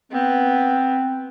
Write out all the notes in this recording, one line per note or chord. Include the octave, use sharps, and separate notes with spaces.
B3 C4